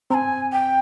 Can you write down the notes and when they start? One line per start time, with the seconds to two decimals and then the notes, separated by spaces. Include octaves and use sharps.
0.10 C4 A#5
0.14 G#5
0.52 G5